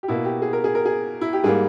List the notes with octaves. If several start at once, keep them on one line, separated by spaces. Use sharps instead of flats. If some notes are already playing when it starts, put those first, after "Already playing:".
G4
B2 A#3 E4
G4
G#4
A#4
G#4
A#4
G#4
E4
G4
G#2 G3 A#3 G#4